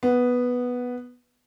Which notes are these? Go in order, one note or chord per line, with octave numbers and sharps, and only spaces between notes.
B3